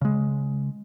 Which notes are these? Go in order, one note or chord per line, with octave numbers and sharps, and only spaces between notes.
C#3 G#3